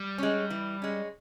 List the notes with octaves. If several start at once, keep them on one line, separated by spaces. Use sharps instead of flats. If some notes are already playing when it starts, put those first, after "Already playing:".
Already playing: G3
G#3 C#4
E3
G#3 C#4